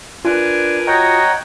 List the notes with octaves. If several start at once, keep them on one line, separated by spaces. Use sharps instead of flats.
D4 F4 A#4 B4 G#5
F#4 C#5 D#5 F#5 G5 A#5 D#6